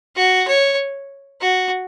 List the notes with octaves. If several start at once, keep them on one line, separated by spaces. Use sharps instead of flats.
F#4
C#5
F#4